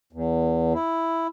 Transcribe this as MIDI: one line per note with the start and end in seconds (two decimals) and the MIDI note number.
0.13 0.73 40
0.74 1.27 64